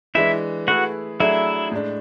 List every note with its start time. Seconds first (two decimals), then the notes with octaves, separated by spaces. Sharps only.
0.15 E3 G#3 D4 E4 E5
0.67 A3 E4 F#4 G#4 B4 F#5
1.20 F#3 A3 D4 E4 G#4 E5
1.72 A2 G#3 D4